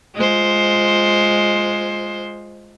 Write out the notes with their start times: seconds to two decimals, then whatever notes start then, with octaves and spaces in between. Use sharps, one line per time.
0.16 G#3 F4 C5